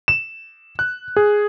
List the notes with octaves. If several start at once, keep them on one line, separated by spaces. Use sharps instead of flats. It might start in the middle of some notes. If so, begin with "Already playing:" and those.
E7
F#6
G#4